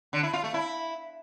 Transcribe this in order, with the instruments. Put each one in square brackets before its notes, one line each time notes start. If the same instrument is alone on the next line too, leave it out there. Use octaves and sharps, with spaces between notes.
[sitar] D3
E4
F4
A3
E4